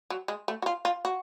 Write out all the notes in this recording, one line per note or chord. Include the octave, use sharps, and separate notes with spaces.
F#3
G#3
A3
F#4
F4
F4
F#4